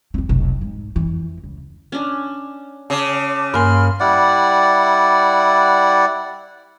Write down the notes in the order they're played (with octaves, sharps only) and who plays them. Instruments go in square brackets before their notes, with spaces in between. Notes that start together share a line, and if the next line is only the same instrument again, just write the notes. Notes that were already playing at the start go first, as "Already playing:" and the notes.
[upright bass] F2 C4
F1 B1
G#2
F2 E3
C#2
[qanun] C#4 D4
[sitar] C#3 [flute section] A5 D6
[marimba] G2 G#5 [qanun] A#3 [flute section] B5 C6 F6
[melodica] G3 E4 D5 F#5